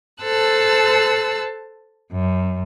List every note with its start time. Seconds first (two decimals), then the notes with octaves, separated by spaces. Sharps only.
0.23 A4 C5 A5 E6 F#6
2.12 F#2